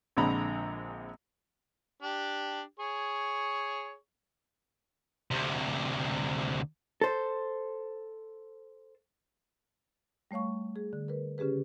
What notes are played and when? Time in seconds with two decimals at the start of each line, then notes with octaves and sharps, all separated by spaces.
0.17 A#1 D3 G#3 C4 A#5 B5
2.02 D4 G4
2.80 G#4 C#5 C#6
5.31 D2 C3
7.01 A4 C5
10.31 G3 A3 C#5 F5 C#6
10.76 G#4
10.93 D3
11.08 A#4 B4
11.38 C#3 C#4 G4 G#4 B4